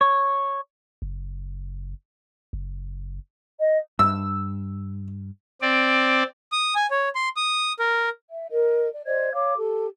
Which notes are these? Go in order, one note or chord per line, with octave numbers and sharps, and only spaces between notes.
C#5
F#1
F#1
D#5
G2 E6
C4 D5
D#6
G#5
C#5
C6
D#6
A#4
E5
A#4 D#5
D5
C5 D5 D#5 G#6
C#5 F5 D6
G4 A4